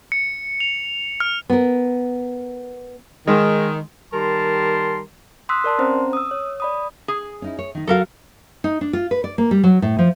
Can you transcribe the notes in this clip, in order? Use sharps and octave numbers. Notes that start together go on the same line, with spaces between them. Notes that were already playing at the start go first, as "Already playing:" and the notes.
C#7
F7
F6
B3 A#4
D#3 G#3
D#3 G3 A#4 A5 C6
C6 D#6 E6 F#6 B6
A#4 D5 A5 C6
C4 C#4 C5 A#5
D#6 E6
C#5
D5 B5 D#6
G#4
C#4 D#4 E4
C#5
D#3 D#4
F#3 F#4 A4 A#4 F5
D#4
D4
F4
B4
D5
A#3
G3
F#3
A2
F3